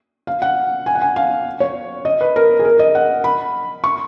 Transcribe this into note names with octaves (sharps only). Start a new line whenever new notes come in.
F5
F#5
G#5
F#5
G#5
F5
C#5
D#5
B4
A#4
G#4
A#4
D#5
F#5
B5
C#6